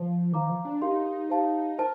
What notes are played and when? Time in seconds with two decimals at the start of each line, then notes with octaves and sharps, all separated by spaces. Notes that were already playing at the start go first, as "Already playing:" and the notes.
Already playing: F3
0.33 D#3 C5 F5 A#5 D6
0.49 F3
0.65 D4
0.81 D#4 G4 A#4 F5 C6
1.30 G4 C5 F5 A5
1.78 A#4 C5 A5